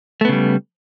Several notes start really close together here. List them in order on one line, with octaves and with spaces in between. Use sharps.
A3 B3 C#3 G3